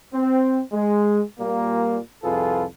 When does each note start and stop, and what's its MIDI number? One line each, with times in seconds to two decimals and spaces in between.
0.14 0.60 60
0.72 1.21 56
1.39 1.97 46
1.39 1.97 55
1.39 1.97 58
2.23 2.64 36
2.23 2.64 41
2.23 2.64 65
2.23 2.64 68
2.23 2.64 69
2.23 2.64 71